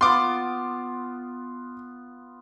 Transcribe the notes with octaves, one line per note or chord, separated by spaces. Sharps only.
B3 F4 C6 D6